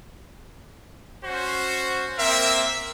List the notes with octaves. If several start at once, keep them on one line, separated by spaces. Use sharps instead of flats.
C#4 F#4 C5
A#3 C4 A#4 E5